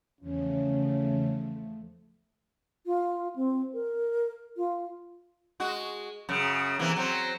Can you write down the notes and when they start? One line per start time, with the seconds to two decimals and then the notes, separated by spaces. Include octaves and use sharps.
0.21 E2 C#3 F3 A3 C#4
2.86 F4
3.36 C4
3.74 A#4
4.57 F4
5.60 G#3 F#4
6.29 F#2 C#3
6.79 C3 E3 A#3
6.96 F#3 C4